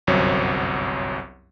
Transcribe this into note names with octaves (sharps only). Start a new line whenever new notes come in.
G1 C2 F#2 F#3 C4 C#5